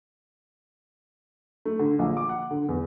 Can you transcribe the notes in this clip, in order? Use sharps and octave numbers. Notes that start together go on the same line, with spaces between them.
A3
D3
A#1
D6
F#5
D3
E2